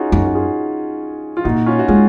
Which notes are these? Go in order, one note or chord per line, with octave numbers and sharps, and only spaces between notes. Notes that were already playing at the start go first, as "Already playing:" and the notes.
Already playing: C#4 D#4 F4 F#4 G#4
F#2 D#4 F#4
F#4
F4 G#4
F4
A#2 D#4 F#4
C#4 F4
F#4
G#3 F4 G#4